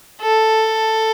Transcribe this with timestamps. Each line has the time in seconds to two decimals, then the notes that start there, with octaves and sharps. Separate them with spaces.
0.22 A4